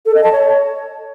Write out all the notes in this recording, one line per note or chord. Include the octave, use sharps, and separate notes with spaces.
A4
D#5
A5
C#5